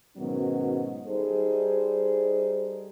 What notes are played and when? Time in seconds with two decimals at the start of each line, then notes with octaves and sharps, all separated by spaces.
0.17 G#2 B2 D#3 F#3 B3 C#4
1.08 G3 D#4 G#4 A4 C5